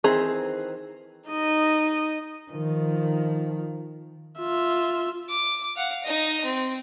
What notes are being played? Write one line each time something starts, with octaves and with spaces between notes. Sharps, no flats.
D#3 E3 C4 G#4 A#5
D#4 D#5
D#3 F3
F4 E5
D6
F5 F#5
D#4 D#5
C4